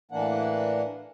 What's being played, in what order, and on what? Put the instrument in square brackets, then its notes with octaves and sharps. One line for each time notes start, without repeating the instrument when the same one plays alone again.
[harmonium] A2 E3 A#3 D4 F#5